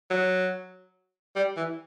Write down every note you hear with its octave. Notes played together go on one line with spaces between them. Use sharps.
F#3
G3
E3